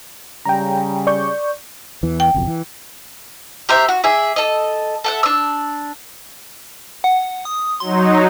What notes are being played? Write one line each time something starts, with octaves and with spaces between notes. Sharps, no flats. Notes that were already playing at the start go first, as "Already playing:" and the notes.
C#3 G3 G5 A#5
D5 C#6 G6
E2 E3
G5
F#1 B1 F2
E3
G4 A#4 C5 E5
F#4
G#4 D5 E5
A4 D#5
A4 E5 F#5
D4 E6
F#5
D#6
F#3 D#4 C6